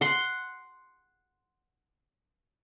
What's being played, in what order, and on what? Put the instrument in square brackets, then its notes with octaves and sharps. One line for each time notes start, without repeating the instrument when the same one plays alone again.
[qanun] F#5 C6